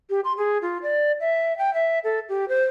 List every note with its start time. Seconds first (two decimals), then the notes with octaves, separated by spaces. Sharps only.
0.10 G4
0.24 C6
0.38 G#4
0.62 F4
0.82 D5
1.20 E5
1.58 G5
1.74 E5
2.04 A4
2.29 G4
2.49 C5